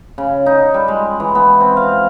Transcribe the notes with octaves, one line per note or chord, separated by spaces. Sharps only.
C#3
D#4
G3
G#3
E3
B3
C4
F5